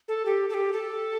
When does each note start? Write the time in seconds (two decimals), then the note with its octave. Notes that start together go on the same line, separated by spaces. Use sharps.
0.08 A4
0.25 G4
0.49 A4
0.54 G4
0.73 A4